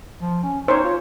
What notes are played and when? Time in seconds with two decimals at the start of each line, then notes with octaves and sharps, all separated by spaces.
0.21 F3
0.43 C#4
0.68 D#4 C5 C#5
0.84 F4